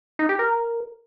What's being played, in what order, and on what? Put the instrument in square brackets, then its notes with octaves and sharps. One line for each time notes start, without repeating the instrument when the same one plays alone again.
[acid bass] D#4
G4
A#4